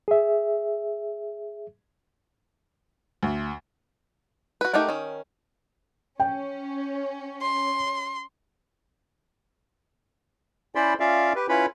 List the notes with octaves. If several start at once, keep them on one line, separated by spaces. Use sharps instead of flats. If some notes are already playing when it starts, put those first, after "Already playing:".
G#4 E5
D2
F#4 B4
A3 D#4 G4 A#4 F#5
D#3 C#4
C#4 G5
C6
C#4 E4 C5 D5 B5 C6
C#4 F4 D5 E5 F5
G4 B4
C#4 E4 F4 B4 C#5 B5